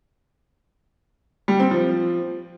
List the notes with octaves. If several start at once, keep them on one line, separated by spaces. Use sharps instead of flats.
G3
C4
F3